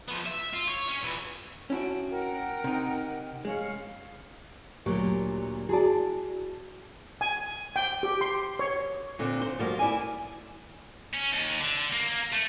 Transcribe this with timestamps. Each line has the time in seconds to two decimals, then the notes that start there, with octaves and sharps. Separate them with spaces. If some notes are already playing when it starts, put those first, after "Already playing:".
0.08 F3 B3
0.26 E5
0.54 F4
0.68 C#5
0.89 C#4
1.03 A#2 E3
1.70 C#4 E4 F#4 G5 A5
2.10 A#4 F#5 G5
2.64 C3 D#4
3.45 G#3 C#4 F5
4.86 D2 A#2 F#3 G4
5.69 E4 F#4 G#4 D5 A5
7.21 G#5
7.76 G5
8.03 G4
8.21 C6
8.59 C#5
9.19 A#2 D3 C4
9.41 C5
9.59 F3 G3 A#3 F#4
9.79 E4 D5 G#5
11.14 C#4
11.33 D#2
11.60 D3
11.93 A#3
12.32 A3